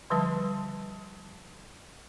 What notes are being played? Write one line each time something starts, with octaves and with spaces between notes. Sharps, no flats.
D3 F3 G3 B4 A5